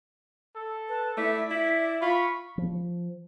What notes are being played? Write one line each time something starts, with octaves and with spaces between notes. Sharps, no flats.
A4
B4 A5
A3 E4 D5 B6
E4 E5
F4 B5 C#6
F3